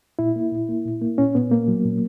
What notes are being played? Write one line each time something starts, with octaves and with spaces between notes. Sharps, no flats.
A#2 E4
A#3
A#2
A#3
A#2
A#3
A#2 C#4
A#2 B3
A#3
F#3
A#2